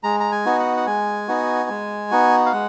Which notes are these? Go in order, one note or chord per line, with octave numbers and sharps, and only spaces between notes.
G#3 A#5
A#5
G#5
B3 D#4 F#4
F#5
F#5
G#3 G#5
B3 D#4 F#4
G#3
B3 D#4 F#4
F5
G#3 F#5